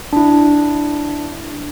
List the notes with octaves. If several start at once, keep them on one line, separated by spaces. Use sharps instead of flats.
D4 E4